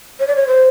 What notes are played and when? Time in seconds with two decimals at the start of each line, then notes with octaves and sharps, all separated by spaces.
0.20 C#5
0.27 D5
0.36 C#5
0.47 C5